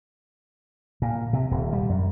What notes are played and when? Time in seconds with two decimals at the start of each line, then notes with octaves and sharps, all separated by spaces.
1.02 A#2
1.33 C3
1.51 D#1
1.73 G3
1.89 F#2